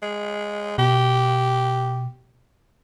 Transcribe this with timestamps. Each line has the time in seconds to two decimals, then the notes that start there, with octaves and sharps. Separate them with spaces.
0.02 G#3
0.78 B2 G4